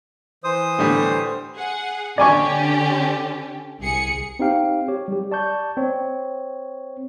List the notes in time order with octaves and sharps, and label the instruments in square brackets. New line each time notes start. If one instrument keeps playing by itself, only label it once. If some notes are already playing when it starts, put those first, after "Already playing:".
[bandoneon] E3 C5 D#6
[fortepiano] A2 D3 G3
[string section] G#4 F#5
[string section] D3 C#4 G4 [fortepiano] D5 G#5 C#6
[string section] C2 G#4 C#7
[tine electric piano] C4 D#4 G4 F5 G5
G4 C#5
G3 G4
D5 A5 C#6 G6
C4 C#5